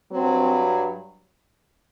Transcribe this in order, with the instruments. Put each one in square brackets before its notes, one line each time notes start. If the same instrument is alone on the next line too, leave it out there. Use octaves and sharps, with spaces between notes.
[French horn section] G2 F#3 C4